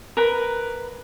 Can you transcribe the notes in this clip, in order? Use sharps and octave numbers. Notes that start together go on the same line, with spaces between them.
A#4 B4 B5